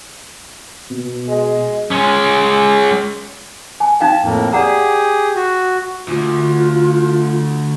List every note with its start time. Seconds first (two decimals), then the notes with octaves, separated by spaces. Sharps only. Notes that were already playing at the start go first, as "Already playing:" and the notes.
0.90 B2
1.28 G#3
1.91 G#3 C#4
3.80 G#5
4.00 D#4 F5 G5 A5
4.23 F2 A2 A#3
4.52 G4 G#4 D5 F#5 A#5 D#6
5.35 F#4
6.08 D2 F4